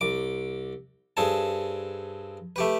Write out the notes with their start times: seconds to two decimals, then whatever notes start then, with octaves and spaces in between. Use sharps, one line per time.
0.01 C2 D6
1.17 G2 C4 G#4 A4 A5
2.56 A3 G4 B4